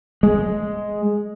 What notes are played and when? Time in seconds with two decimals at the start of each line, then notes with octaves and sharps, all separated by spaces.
0.23 G#3